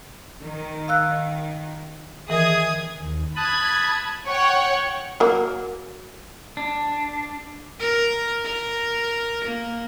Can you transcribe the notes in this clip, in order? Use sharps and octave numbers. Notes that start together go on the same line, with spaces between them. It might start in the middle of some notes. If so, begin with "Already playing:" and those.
D#3
F5 E6 F#6
D#3 E3 G#4 A#4 D#6 G#6
D#2
A5 B5 D#6 F#6 G#6
C#5 F#5 G5 C#6
F#3 A#3
D4
A#4
A#4
A#3